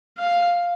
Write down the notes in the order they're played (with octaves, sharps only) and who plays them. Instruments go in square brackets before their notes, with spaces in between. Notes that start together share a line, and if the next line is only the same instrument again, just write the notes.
[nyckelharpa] F5